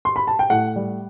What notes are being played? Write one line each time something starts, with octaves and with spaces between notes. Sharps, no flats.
C6
B5
A5
G5
A2 F#5
G3